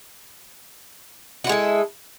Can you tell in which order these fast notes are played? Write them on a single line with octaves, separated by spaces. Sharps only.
F#4 E4 G#3 A4